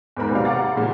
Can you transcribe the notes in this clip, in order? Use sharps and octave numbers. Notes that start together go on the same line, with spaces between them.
E2 G#2 A#4 B5
D#2 C3 F#3 D5 F5
F5 F#5 A#5 D6 A6
A#2 C#3 E3 G3 G#3